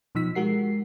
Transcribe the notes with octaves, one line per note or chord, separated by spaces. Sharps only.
B2 F3 D#4 E6 B6
G#3 F#4 G4 A#4 F#5 C7